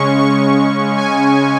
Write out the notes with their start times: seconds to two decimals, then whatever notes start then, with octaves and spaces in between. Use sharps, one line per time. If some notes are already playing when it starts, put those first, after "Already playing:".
Already playing: C#3 G#3 C#4 C#6
0.19 C#6
0.96 G#5